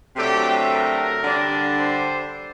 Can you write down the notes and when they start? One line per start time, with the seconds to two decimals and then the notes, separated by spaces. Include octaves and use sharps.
0.16 C3 F#3 A3 D4 G4
0.70 A#4
1.24 D3 G3 D4
1.78 C5